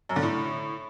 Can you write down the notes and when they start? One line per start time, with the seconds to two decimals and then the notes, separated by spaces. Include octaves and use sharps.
0.09 F#2
0.16 D3
0.23 A2